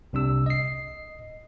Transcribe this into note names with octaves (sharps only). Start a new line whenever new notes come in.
C2 C3 D4 E6
D#5 C7